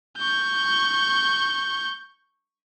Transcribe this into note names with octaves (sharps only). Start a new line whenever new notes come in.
C#6 G6